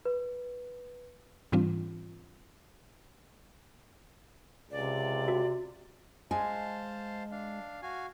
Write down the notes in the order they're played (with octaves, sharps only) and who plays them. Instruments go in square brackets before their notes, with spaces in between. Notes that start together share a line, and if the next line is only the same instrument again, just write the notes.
[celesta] B4
[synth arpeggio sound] G#2 E3 G3 C4 D4 F4
[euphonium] C#2 [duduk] C3 [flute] D5
[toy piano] F#4
[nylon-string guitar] G#3 G#5 [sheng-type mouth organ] C5 F5 A5
[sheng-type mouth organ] D4 F5
F#4 F5 G#5